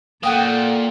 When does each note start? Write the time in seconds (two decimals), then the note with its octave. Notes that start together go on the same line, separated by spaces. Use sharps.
0.23 A#2 F#4 A4 G5 D#6